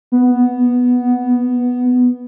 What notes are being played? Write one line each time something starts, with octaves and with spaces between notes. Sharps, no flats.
B3